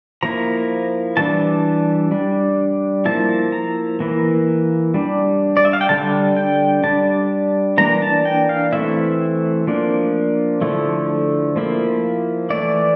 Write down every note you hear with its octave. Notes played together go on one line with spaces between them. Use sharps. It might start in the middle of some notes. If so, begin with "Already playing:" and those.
F3 A#3 E4 A#5
E3 G3 D4 A5
G3 D4
F3 A#3 E4 A5
A#5
E3 A#3 E4
G3 D4
D5
E5
F5
G5
D3 G3 D4 A5
G5
G3 D4 A5
E3 A#3 D4 A#5
A5
G5
F5
E3 A3 C4 E4 E5
F3 A#3 D4
D3 F3 A3 E4
F3 A#3 E4
E3 A3 E4 D5